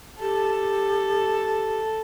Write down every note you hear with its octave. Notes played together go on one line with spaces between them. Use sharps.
G4 A4